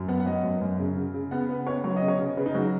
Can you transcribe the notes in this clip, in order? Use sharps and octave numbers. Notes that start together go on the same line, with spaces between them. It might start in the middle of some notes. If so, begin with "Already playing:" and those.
Already playing: F#2
B3 F#5
F#5
F#3 D#5
F#2
F#2
C#3
C#3
C#3
B3 F#5
C#3 B4
B3 C#5
F#3 C#5
D#5
C#3
C#5
C#3
C#3 B4
D#4
F#3 F#4